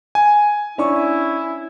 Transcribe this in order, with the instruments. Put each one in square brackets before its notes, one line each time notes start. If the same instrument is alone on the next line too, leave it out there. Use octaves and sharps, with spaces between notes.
[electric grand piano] G#5
[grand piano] C#4 D4 C#6 [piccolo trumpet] E4